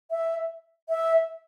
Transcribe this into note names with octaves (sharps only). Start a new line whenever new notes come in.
E5
E5